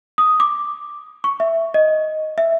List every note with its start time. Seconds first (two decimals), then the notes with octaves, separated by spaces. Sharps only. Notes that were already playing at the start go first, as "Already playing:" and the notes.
0.18 D#6
0.40 D6
1.24 C#6
1.40 E5
1.74 D#5
2.38 E5